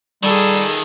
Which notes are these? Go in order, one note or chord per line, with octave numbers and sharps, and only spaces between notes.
A#2 D#3 G3 G#4 A4